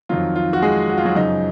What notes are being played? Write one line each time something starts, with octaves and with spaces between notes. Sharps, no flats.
F2 D#3 F#3 F4
F4
F#4
G#3 G#4
F#4
F4
F#3 F#4
F#2 C#3 F3 D#4